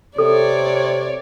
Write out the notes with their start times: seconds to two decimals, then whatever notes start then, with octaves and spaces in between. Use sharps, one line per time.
0.18 C3 A4 C#5 D5